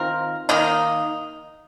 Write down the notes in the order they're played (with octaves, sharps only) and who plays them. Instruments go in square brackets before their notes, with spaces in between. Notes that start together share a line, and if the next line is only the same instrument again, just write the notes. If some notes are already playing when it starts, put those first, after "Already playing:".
Already playing: [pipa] D#3 C4 F4 A#4
D#3 A#3 D#4